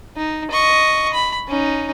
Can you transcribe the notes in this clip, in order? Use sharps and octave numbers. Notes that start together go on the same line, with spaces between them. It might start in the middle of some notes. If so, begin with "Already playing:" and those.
D#4
D#5 C#6
B5
C#4 D#4